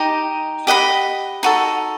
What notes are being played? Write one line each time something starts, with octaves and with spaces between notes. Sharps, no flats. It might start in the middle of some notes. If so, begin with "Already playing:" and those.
Already playing: D#4 G4 D#5
G4 D#5 F#5 B5
D#4 F#4 A4